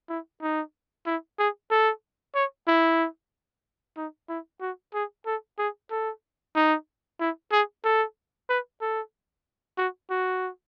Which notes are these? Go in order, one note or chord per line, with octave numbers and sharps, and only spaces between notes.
E4
D#4
E4
G#4
A4
C#5
E4
D#4
E4
F#4
G#4
A4
G#4
A4
D#4
E4
G#4
A4
B4
A4
F#4
F#4